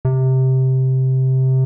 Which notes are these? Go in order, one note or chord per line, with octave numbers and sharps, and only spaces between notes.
C3